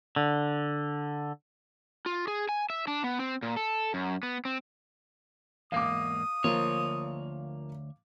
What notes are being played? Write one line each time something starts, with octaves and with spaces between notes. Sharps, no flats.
D3
F4
G#4
G#5
E5
D4
B3
C4
A#2
A4
F#2
B3
C4
E2 G#2 A#3 F5 D6 D#6
D2 F3 A#3 C#5